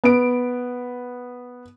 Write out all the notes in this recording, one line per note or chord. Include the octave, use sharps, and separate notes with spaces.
B3 D7